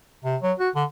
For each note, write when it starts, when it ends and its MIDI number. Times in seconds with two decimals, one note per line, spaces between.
0.25 0.37 48
0.42 0.53 54
0.60 0.70 66
0.75 0.85 50